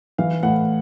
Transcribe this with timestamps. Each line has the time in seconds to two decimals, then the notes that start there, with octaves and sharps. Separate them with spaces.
0.18 E3 F5
0.43 A2 F#5